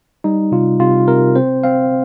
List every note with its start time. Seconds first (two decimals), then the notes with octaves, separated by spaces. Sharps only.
0.24 G3 D#4
0.52 C3 F4
0.79 C3 F4
1.07 C3 A#4
1.36 C4 C5
1.63 C4 F5